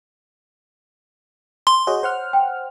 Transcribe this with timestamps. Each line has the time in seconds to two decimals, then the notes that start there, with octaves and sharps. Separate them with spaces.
1.67 C6
1.87 F#4 G#4 C#5 D#5
2.03 C5 F#5 F6
2.33 G5